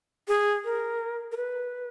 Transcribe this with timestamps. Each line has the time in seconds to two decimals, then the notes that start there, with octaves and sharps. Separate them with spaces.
0.28 G#4
0.65 A#4
1.32 A#4
1.37 B4